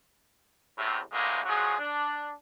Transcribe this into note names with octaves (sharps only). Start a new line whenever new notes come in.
E2 A2 C3
D2 A2 C3 G#3 A#3
F3 F#3 G#3 F#4 G#4
D4